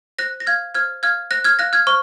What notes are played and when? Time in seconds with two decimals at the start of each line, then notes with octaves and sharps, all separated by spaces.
0.19 C5 F#6 A#6
0.40 A#6
0.47 F5 F6 G#6
0.75 C5 F6 G#6
1.03 F5 F6 G#6
1.31 C5 F#6 A#6
1.44 F6 G#6
1.59 F5 F#6 A#6
1.73 F6 G#6
1.87 C5 C#6 F6